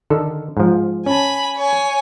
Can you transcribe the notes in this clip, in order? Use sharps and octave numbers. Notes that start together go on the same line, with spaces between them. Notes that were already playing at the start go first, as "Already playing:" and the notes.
D3 D#3 A4
G#2 F3
C#4 G#5 A5 B5
C#5 G#5